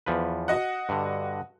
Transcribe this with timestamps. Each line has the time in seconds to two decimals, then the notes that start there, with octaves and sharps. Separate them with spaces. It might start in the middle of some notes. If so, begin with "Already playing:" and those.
0.06 E2 F3 B4
0.48 F#4 D#5 F#5
0.89 G2 D3